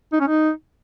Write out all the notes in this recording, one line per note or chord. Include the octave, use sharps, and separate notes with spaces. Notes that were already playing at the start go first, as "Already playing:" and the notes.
D#4
C#4
D#4